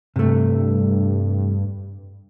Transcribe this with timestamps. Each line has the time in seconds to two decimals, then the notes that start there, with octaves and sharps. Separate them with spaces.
0.16 G2 C3 A3